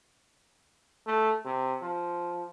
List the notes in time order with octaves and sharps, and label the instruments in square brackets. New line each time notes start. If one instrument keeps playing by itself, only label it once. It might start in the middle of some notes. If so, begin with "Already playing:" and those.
[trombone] A3
C3
F3